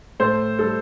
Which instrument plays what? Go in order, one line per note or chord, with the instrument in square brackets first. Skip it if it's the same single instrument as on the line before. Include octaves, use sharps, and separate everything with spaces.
[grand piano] A2 A4 C5
G3 A4